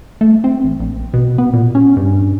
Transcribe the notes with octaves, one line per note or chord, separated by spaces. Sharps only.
A3
C4
A1
A#1
B2
B3
A#2
C#4
G2